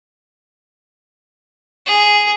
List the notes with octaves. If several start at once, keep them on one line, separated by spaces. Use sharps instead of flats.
G#4